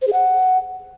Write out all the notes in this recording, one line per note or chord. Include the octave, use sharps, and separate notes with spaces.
C5
G#4
F#5